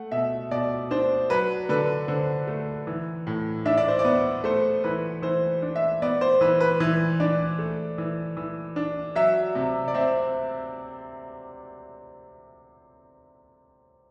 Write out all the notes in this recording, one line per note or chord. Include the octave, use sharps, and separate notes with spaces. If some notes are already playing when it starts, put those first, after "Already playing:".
Already playing: A3 F#5
B2 E5
B2 D5
D4 C5
F#3 B4
D3 B4
D3 C5
A3
E3
A2
D4 E5
D5
C5
D5
B3
A3 C5
E3 B4
E3 C5
D4
E5
B3 D5
C5
E3 B4
B4
E3
D4 D5
A3
E3
E3
D4
F#3 E5
C3
D5
C4 E5